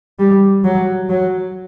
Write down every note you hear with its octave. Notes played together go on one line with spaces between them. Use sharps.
G3
F#3
F#3